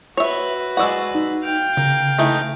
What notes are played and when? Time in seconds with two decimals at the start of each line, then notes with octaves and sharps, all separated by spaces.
0.17 F#4 B4 C#5 E5
0.77 G#3 D5 F#5 C#6 E6
1.15 D#4
1.44 F5 G5
1.77 C#3 A#4
2.18 E3 A3 D#4